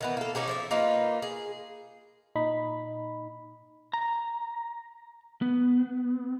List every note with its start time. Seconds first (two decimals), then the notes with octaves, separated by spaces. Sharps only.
0.01 D#3 E3 B3
0.17 A#3 A4
0.35 C#4 D#4 G4 G#4
0.47 F3 C#5 E5
0.71 A#3 D#4 F4 B4
1.22 G#4
2.35 A#2 D#4 B5
3.93 A#5
5.42 B3